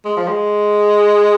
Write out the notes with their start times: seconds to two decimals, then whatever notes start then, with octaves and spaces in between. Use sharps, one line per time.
0.05 G#3
0.17 F3
0.28 G#3